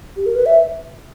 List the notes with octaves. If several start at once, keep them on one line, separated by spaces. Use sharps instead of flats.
G4
A#4
B4
E5